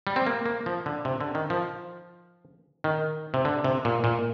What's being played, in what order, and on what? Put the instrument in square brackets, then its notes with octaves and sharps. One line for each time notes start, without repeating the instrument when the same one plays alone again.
[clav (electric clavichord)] G3
C4
A#3
A#3
F3
D3
C3
D3
D#3
F3
D#3
C3
D3
C3
A#2
A#2